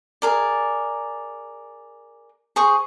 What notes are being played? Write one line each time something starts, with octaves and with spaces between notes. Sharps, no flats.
G#4 A#4 D5
G#4 C5 C#6 D#6